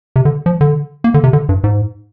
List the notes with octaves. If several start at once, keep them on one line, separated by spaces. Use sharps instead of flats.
C3
D3
F3
D3
A#3
D3
C3
D3
G2
G#2